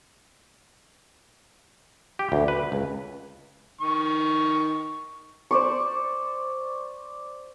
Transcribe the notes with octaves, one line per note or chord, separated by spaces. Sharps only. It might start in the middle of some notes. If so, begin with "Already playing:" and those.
G4
D2
B4
C#2
D#3 C#6
C5 D5 C#6